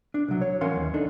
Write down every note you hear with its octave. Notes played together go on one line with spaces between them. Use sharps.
D4
C2 F#3
C#5
E3 C#4 A#4 F5 F#5 C6
D#2
D4 D#4 A4